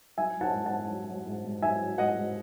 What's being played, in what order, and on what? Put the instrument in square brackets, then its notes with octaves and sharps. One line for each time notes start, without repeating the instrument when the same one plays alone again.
[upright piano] F#3 E5 G#5
F#3 F#5 A5
G#2
F#5 A5
G#2
F#3
F#3
G#2
G#2
F#3 E5 G#5
F#3
G#2 D#5 F#5
G#2